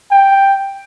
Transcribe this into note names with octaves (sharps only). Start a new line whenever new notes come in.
G5